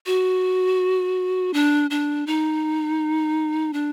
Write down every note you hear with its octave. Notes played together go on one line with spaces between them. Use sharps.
F#4
D4
D4
D#4
D4